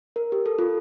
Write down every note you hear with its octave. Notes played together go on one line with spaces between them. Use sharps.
A#4
G4
A4
F4